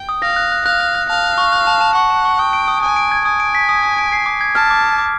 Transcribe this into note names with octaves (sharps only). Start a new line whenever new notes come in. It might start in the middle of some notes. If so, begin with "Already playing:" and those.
Already playing: G5
D#6
F5 A#6
F#6
F#6
F5 F#6
F#6
F#6
F5 A5
F#6
C#6
F#6
A5
A5
F#5 C#6
A5
C#6
G5 D#6
D7
D#6
G#5 D#6
D7
G#6
G#5 D#6
D7
B6
D#6
D#6
D7
C7
D6
G#6
A5 F6
D6
D6
D6